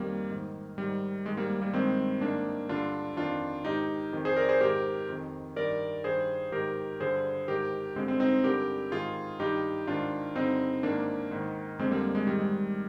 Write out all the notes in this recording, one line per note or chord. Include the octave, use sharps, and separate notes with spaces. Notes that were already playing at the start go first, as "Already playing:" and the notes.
Already playing: F2 D#3 G3 A#3
G#2 D#3
G#2 D#3 G3
G#2 D#3 G#3
G3 A#3
G3 A#3
G2 D#3 G#3 C4
G#2 D#3 A#3 D4
G2 D3 D4 F4
F2 D#3 D4 F4
G#2 D#3 D#4 G4
F2 D#3
G#4 C5
A#4 D5
G#4 C5
G#2 D#3 G4 A#4
F2 D#3
G2 D#3 A#4 D5
G2 D#3 G#4 C5
G#2 D#3 G4 A#4
G2 D3 G#4 C5
G#2 D#3 G4 A#4
G2 D3 G#3 C4
G#3 C4
C4 D#4
G2 D3 G4 A#4
G#2 D#3 F4 G#4
G2 D#3 D#4 G4
G#2 D#3 D4 F4
G2 D3 C4 D#4
G#2 D#3 A#3 D4
G#2 D#3
F2 D3 G#3 C4
G3 A#3
G#3
G#2 D#3 G3
G#3